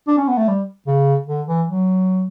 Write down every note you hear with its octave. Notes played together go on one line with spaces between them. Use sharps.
D4
C#4
B3
A3
G3
C#3
D3
E3
F#3